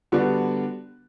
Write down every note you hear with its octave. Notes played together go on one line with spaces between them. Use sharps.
D3 G3 B3 D4 F#4